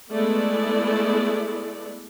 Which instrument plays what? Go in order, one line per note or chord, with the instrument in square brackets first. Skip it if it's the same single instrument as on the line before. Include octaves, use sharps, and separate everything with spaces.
[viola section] G#3 A3 B3 E4 D5